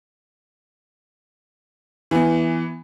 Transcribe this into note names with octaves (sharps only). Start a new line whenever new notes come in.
E3 B3